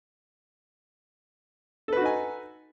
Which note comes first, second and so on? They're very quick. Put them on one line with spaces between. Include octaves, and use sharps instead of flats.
A4 B4 F#4 D#4 G#5